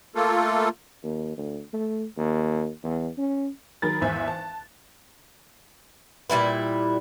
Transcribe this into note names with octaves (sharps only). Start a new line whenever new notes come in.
A3 A#3 F4 A4
D#2
D2
A3
D#2
E2
C#4
D#3 F#3 G#4 A#4 B5 A6
G#1 E2 C5 E5 G#5 F#6
A5
A#2 G3 E4 B4